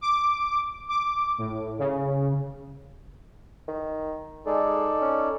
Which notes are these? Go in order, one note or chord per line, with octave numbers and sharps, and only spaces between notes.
D6
D6
A2
C#3
D#3
G#3 D#4 A4 D5
C#4